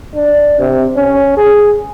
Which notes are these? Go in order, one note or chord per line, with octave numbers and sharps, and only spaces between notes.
D4
C3
C#4
G#4